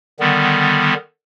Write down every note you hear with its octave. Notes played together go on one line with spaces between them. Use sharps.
D3 D#3 G3 B3